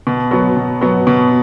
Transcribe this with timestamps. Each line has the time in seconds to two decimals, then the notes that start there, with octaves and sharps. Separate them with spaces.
0.07 B2
0.31 F#3 B3
0.56 B2
0.81 F#3 B3
1.07 B2